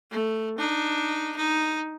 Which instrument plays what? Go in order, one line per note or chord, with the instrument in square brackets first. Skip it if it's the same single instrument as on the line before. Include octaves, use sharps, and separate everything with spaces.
[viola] A3
D4 D#4
D#4